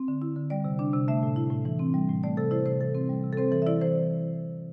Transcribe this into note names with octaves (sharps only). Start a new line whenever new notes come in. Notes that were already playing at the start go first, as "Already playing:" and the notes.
Already playing: C4
D3
E4
D3
G3 D5
C3
D4
C3
A3 E5
A2
E4
A2
E3
C4
G3
A2
A3 D5
C3 A4
E4 C5
C3 C5
E3 A4
C4
G3
C3
A4
C4 C5
E3 A4
E5
E4 D5
E3 C5